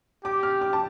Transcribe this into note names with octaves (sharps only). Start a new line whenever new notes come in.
G4 D6
F6
D6
A5